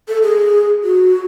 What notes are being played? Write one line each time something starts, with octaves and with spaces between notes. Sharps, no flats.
A4
G#4
F#4